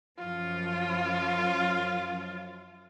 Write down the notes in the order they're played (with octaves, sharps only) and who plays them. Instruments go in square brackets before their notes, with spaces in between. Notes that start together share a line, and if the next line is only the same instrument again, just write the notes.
[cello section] F#2 F3 [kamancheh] F4